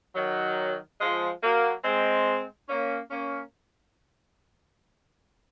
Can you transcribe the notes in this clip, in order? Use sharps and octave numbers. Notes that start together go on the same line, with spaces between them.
D#3 F#3
F3 G#3
F#3 A#3
G#3 C4
A#3 C#4
A#3 C#4